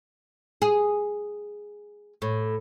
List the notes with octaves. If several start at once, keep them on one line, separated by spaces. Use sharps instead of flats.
G#4
A2